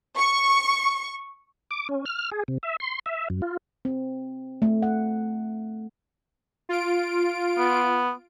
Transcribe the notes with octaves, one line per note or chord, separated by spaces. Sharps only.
C#6
D6
C#4
F6
G#4
C3
E5
C6
E5
F#2
F4
C4
A3
F#5
F4 D7
B3